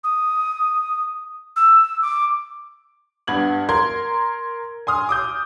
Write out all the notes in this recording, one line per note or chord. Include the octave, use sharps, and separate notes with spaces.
D#6
E6
D6
G2 B3 G#6 F#7
A#4 C6 G#6
G#5 C6 D#6 F6
D6 D#6 G6